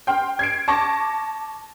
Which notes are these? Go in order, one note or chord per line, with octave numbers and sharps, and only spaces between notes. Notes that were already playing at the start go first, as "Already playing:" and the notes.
G5 C6 F6
G#6 C7 D7
A5 C#6 D6 A#6